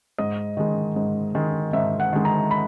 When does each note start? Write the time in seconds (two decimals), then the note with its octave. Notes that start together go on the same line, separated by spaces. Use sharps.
0.18 G#2 D#5
0.57 D#3 G#3
0.96 G#2
1.35 D#3 G#3
1.73 G#2 E5
2.00 F#5
2.13 D#3 G#3
2.25 A#5
2.51 B5